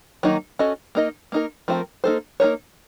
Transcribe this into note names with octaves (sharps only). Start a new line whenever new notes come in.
D#3 F#3 A#3 D#4 F#4
C#4 F#4 A4 D#5
A#3 D#4 A#4 D#5
A#3 D#4 A#4
F3 A3 C4 F4 A#4
A#3 D#4 A4 C5
A#3 D#4 A#4 C#5